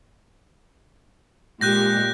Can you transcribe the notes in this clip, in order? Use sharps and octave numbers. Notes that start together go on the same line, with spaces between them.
A#2 G#3 G4 F#6 G6 A#6